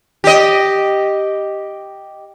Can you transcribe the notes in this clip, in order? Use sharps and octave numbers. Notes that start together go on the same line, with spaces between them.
G4 D#5